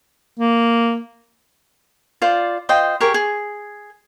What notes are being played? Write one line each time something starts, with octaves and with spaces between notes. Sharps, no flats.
A#3
F4 C5 D5
F4 C5 D#5 G5
G4 G#4 A#4 C#6
G#4